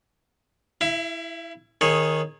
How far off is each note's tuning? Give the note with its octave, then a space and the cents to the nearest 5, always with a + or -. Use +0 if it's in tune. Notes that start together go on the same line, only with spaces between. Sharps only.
E4 +0 E5 +45
D#3 +0 G#4 +10 C#5 -20